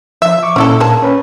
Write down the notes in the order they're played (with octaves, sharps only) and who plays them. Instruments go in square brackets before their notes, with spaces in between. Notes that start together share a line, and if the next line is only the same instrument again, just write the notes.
[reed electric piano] F3 [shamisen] E5
[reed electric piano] C#6 D6
[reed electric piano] A#2 [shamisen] C#4 E4 A4
[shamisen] A#3 G#4 A5
[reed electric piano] C#4 B4